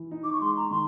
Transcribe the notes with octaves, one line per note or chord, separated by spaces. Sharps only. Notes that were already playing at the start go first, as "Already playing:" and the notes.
Already playing: E3
D#4
D6
C#6
G#3 C6
A#5
D#3 C6